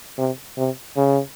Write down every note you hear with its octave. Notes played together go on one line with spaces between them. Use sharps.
C3
C3
C#3